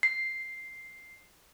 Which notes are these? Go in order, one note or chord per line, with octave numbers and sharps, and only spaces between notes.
C7